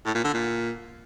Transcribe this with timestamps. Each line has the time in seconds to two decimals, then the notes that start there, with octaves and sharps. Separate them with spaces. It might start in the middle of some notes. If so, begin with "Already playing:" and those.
0.05 A2
0.15 A#2
0.24 D3
0.34 A#2